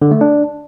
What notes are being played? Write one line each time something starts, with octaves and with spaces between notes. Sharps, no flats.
D3
A3
D4